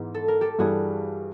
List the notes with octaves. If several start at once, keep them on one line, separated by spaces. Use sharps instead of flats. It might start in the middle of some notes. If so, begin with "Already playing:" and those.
Already playing: G#2 E3 G#3 B3 D#4
A4
A#4
G4 A4
G2 E3 G3 F#4 G#4